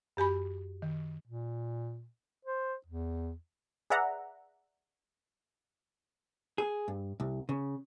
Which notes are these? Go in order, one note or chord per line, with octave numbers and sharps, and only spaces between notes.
F#2 G4 G#5 B5
D#3
A#2
C5
E2
G#4 B4 D5 E5 F#5 A#5
G#4
G2
C2
C#3